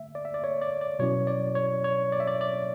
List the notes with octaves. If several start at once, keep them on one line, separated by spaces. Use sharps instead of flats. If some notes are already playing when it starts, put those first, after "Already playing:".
Already playing: D3 A3 E5
D5
E5
D5
C#5
D5
D5
B2 F#3 C#4 E4 C#5
D5
C#5
C#5
D5
E5
D5
D5